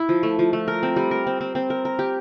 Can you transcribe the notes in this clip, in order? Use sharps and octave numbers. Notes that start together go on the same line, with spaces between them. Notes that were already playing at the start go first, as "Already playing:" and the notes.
Already playing: E4
F3
A3
F3
A3
A#4
C4
G3
A#4
C4
C4
C4
A#4
A#4
G4